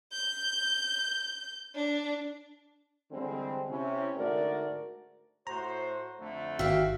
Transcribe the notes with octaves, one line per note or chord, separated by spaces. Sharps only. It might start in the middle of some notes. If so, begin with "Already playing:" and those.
G6
D4
D3 E3 G3 G#3 C4
C3 C#4 E4
G#2 D3 A3 F#4 A#4 D5
A2 F#4 C5 A#5
F2 D3 A3
G#1 F#4 G4 E5 F5